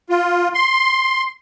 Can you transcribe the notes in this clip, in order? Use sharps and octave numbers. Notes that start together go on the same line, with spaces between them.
F4
C6